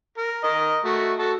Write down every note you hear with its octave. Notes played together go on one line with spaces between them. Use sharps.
A#4
A#4 D#5
A3 F#4
F#4 A4